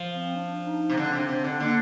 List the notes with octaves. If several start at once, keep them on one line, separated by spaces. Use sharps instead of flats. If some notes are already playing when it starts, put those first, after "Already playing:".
Already playing: F3
C4
D4
D#4
C3
D3 D4
C4
C3 D4
C3 C4
D3
D3 A#3